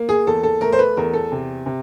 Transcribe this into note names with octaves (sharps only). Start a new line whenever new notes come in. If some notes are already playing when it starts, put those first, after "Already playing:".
Already playing: A#3
G#4
E2 A4
A4
A3 A#4
C5
B4
E2 A#4
A4
C3
C3